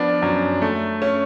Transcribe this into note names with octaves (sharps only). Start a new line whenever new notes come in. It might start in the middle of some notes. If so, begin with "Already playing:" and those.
Already playing: F3 B3 D4
F#2
A3
C#4